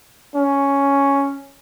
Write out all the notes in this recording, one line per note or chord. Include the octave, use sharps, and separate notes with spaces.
C#4